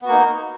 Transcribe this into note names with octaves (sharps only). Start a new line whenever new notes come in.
A#3 B3 D#4 F#4